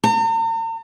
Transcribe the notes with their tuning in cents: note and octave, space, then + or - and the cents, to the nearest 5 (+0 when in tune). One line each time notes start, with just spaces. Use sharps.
A#5 -45